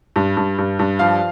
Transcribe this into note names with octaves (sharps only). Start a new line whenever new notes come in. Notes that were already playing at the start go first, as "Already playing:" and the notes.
G2
G2
G2
G2
F3 F5